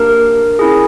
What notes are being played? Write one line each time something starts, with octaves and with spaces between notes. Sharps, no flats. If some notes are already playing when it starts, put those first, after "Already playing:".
Already playing: A#3 D4 G4 A#4
C#4 E4 G#4